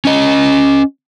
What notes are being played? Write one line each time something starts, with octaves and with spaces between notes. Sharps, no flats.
C#4 D#5